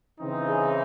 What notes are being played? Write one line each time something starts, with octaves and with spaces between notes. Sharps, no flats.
C#3 E3 C4 D#4
G#4